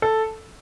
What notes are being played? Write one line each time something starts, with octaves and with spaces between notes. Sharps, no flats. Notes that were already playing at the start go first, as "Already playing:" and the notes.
A4